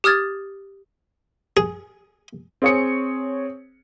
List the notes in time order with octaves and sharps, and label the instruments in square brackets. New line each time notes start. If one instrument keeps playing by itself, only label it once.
[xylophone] G4 D#6 F6 G#6 A6
[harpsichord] G#4
[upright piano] C4 G#4 C#5 D#6 C#7